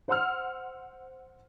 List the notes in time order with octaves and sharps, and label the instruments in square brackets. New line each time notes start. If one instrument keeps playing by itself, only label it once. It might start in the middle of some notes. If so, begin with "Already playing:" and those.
[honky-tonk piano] C5 F#5 C6 E6 F6